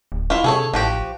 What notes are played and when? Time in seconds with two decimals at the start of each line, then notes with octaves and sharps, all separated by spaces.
0.12 D1
0.30 E4 F4
0.44 C3 G#4 A4 C#5
0.74 A1 F3 F#4 G4